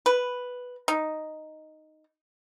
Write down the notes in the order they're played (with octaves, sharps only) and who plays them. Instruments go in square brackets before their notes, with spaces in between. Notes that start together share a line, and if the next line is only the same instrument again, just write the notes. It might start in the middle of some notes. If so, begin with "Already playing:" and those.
[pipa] B4
D#4